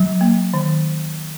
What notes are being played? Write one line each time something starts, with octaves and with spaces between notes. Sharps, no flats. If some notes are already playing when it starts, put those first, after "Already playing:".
Already playing: F#3
A#3
D#3